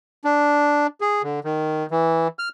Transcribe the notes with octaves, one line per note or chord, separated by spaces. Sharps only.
D4
G#4
D3
D#3
E3
F6